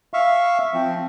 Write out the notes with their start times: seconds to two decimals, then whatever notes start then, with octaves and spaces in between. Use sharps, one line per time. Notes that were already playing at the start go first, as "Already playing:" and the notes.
0.14 E5 F5 C#6
0.74 F3 C4